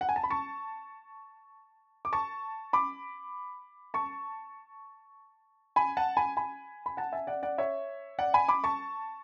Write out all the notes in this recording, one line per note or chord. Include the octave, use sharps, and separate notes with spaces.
F#5
G#5
A5
B5
A5 C#6
D6
A5 C#6
B5 D6
A5 C#6
G#5 B5
F#5 A5
G#5 B5
G#5 B5
B5
F#5 A5
E5 G#5
D5 F#5
D5 F#5
C#5 E5
D5 F#5
G#5 B5
B5 D6
A5 C#6